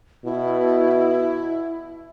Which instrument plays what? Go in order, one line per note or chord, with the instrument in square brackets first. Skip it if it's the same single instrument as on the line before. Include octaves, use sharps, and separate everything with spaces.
[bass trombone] B2 [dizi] E4